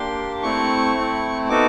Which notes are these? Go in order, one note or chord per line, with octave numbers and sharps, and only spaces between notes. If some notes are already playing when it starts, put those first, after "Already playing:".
Already playing: A#3 D4 G4 C6
A3 C4 E4 C#6
A3 C4 E4
B3 D#4 F#4 A4 D6